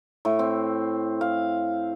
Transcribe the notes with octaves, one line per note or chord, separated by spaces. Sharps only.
A2
C4
F5